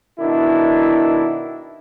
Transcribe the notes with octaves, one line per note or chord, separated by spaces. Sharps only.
B2 D#3 D4 E4